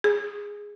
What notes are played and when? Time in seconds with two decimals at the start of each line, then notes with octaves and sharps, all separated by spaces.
0.04 G#4